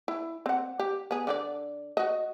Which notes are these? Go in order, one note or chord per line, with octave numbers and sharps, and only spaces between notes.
E4
C4 F#5
G4
B3 G#4
D3 E4 D5
F#4 D#5